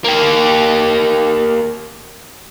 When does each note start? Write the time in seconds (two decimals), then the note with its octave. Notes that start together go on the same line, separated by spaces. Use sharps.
0.04 A#3 G4